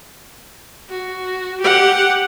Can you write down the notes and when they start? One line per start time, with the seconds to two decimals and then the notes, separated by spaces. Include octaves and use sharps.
0.90 F#4
1.61 G4 F#5